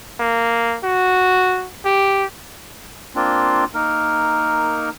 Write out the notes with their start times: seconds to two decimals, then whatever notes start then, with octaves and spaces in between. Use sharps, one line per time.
0.19 A#3
0.83 F#4
1.85 G4
3.16 A#3 C4 D4 F4
3.74 A#3 D#4 A#4